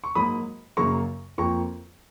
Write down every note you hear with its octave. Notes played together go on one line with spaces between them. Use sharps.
C#6
G#2 F#3 A#3 B5 D#6
F#2 C#3 F#3 A#3 A#5 C#6
F2 F3 A#3 A#5 C#6